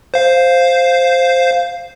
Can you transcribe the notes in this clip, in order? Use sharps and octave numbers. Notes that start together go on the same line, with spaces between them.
C5 F5